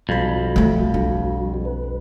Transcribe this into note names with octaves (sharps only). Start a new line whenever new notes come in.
B1 F2 G3 F#4 B5
F3 A3
D4
B4